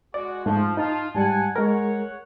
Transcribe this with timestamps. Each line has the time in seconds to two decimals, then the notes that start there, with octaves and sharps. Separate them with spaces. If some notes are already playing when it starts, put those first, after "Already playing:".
0.14 G#3 F#4 D5
0.46 G#2 F3 A3
0.77 D#4 F4 A5
1.15 G#2 G3 F#5 G#5 A5
1.56 G#3 A#4 C#5 F#5